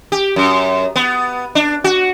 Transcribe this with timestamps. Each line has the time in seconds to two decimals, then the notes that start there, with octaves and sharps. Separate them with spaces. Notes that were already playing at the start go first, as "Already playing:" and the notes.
0.12 G4
0.36 F#2
0.96 B3
1.55 D4
1.84 F#4